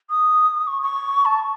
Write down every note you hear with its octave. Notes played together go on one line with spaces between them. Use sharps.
D#6
C#6
C#6
A5